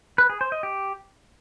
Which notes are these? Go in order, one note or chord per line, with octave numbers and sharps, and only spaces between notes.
B4
G#4
C5
D#5
G4